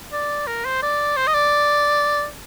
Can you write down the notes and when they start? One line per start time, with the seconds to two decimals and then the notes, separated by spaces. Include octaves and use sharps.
0.13 D5
0.47 A#4
0.65 C5
0.83 D5
1.17 C5
1.27 D#5
1.34 D5